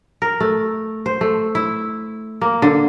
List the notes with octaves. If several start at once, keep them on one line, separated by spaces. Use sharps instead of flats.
A#4
A3
C5
A3
E4
A#3
D3